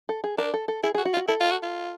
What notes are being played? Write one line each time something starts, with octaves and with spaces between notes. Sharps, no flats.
A4
G#4
D4 A#4
A4
A4
E4 G#4
F#4 G#4
F#4
F4
F#4
E4 A4
F4
F#4
F4